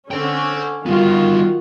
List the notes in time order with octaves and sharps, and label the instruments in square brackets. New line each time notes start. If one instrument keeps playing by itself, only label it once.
[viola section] D3 C#4 [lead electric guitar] C5 G5
[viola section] D#3 F4 F#4 [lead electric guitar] G3 B3